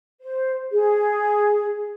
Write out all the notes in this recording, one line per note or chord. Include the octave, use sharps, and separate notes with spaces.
C5
G#4